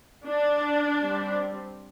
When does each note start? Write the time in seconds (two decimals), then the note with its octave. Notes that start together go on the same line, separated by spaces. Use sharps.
0.26 D4
1.02 G3 C4